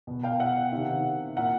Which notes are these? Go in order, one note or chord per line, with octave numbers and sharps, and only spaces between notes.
B2
F5 G5
E5 F#5
C3 D#3
A#2 E5 F#5